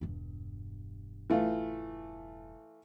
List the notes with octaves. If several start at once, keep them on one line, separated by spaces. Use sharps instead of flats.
E1 G2
E3 A3 F4